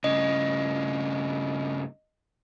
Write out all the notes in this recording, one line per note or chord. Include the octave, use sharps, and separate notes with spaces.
G2 C#3 D#5